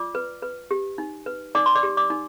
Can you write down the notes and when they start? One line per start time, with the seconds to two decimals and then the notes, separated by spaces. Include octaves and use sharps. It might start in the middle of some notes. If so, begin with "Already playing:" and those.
Already playing: F4 D5 D6
0.15 B4
0.42 B4
0.71 G4
0.98 D#4
1.26 B4
1.55 D#4 D5 D6
1.66 C6
1.75 D5 D6
1.83 G4
1.97 D5 D6
2.10 D#4